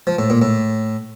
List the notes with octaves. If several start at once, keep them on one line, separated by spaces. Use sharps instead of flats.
F3
A2
A#2
A2